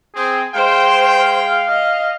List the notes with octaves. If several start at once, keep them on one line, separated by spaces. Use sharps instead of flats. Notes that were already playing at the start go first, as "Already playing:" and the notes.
C4 G#4
G#3 C5 F5 G5
D#5